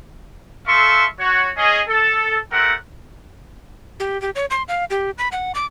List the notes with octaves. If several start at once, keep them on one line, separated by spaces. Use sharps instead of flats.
A3 A4 E5 F5 C6 C#6
F#4 C#5
C#4 G#4 D#5
A4
A3 C4 G4 A#4 F#5
G4
G4
C#5
C6
F5
G4
B5
F#5
D6